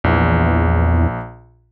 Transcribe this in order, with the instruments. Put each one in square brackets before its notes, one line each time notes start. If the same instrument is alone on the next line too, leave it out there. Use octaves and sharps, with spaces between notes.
[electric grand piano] A#1 [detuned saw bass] E2